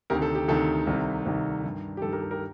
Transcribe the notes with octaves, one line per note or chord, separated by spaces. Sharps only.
D2 C3 D#3 G4 A#4
A4
G4
D2 C3 D#3 A4
C2 C3 D#3
C2 C3 D#3
G2 D#3
G4
G2 D#3 A4
G4 A#4
A4
G4 A#4